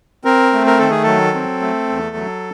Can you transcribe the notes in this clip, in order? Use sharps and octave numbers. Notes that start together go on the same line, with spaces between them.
C4 A#4
A3
A#4
D#3 A4
G#4
F#3 A4
C4
A3
E2
F#3